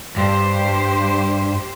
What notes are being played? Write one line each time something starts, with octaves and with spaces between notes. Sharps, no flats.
G2 G4 C5